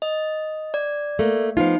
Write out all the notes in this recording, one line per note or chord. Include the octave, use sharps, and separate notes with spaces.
D#5
D5
A3 A#3
F3 B3 D#4 F4